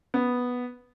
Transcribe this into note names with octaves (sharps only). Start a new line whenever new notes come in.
B3